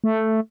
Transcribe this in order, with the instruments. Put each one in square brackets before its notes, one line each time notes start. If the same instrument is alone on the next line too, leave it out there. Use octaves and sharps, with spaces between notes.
[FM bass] A3